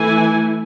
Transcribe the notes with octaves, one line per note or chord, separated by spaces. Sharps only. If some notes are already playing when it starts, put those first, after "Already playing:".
Already playing: E3 A3 E4 G#5